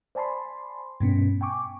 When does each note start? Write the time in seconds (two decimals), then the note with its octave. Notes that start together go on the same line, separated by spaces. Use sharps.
0.15 C5 D5 G#5 A5 B5 C6
1.00 G2 B2 B3 C#4
1.41 G5 G#5 C#6 D6